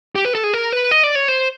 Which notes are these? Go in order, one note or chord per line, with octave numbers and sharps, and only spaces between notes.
G4
B4
A4
G#4
A#4
B4
D#5
D5
C#5
C5